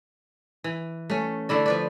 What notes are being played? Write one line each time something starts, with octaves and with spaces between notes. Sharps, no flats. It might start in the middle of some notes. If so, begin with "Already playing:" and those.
E3
A3 C#4
D3 A3 E4 D5
F3 B4 D5